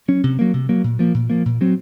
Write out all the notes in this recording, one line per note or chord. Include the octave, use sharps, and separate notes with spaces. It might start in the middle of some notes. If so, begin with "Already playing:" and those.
F#3 C#4
C3
F#3 A#3
C3
F#3 A#3
A#2
F3 A#3
A#2
F3 A#3
A#2
F#3 C4